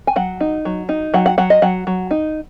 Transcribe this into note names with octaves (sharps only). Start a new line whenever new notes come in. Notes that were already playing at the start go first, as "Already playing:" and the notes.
G#5
F#3 F#5
D#4
F#3
D#4
F#3 F#5
F#5
F#3 F#5
D#5
F#3 F#5
F#3
D#4